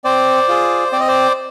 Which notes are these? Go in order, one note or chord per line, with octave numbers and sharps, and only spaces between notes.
C4 C5 D5
F4 G#4
C4 D5
D#5
C5 D5